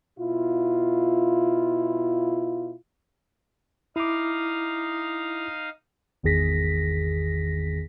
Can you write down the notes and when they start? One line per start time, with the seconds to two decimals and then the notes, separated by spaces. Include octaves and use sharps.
0.18 B2 E4 F4
3.96 D#4 E4 F5 D6 D#6
6.23 G#1 E2 D#3 G#4 A#6 B6